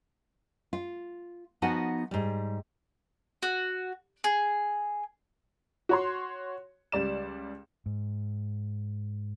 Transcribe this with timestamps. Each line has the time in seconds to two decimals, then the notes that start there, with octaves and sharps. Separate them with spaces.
0.73 F4
1.62 F3 B3 D#4 F#4 F#5 G#5
2.11 G#2 G3
3.43 F#4
4.24 G#4
5.89 F#4 C#5 C6
6.92 C#2 G3 D5 E7
7.86 G#2